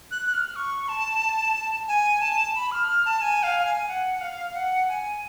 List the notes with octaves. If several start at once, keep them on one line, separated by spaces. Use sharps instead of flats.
F#6
F#6
F6
C#6
A5
G#5
A5
B5
F6
F6
A5
G#5
F5
G#5
F#5
F5
F#5
G#5